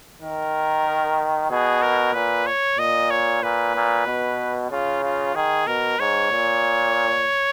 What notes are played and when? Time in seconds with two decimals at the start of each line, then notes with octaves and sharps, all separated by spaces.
0.22 D#3 A#4
1.50 B2 G#4
1.82 A#4
2.14 A#2 B4
2.47 C#5
2.79 A#2 D#5
3.11 C#5
3.43 A#2 B4
3.75 A#2
4.07 B2
4.71 C#3 F4
5.04 F4
5.35 D#3 G#4
5.67 B2 A#4
5.99 G#2 C#5
6.32 A#2